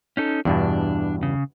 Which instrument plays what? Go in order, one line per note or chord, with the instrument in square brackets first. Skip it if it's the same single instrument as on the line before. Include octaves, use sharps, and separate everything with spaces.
[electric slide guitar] C#4 D#4 A4
[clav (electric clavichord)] E2 G2 B2 [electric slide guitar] D4
[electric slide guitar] C#3